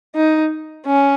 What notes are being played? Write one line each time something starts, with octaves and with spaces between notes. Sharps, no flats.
D#4
C#4